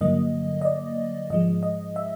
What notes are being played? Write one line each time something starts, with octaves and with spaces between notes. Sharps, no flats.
G2 D3 F#3 A#3 D#5
D#5
D5
G#2 F3 G#3 D#5
D#5
E5